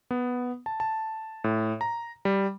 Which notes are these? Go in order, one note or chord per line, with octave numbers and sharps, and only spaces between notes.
B3
A5
A5
A2
A#5
G3